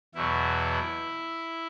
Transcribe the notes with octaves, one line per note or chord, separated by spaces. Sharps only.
E2 B2 F#3 E4